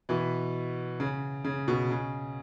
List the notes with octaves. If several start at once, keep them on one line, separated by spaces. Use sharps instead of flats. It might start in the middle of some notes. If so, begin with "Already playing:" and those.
B2 E3
C#3
C#3
B2
C#3